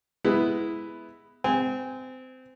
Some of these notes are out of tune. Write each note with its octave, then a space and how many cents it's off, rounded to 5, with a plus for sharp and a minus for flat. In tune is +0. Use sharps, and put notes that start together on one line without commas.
G#3 +5 B3 +10 E4 +0
C4 -25 G#5 -15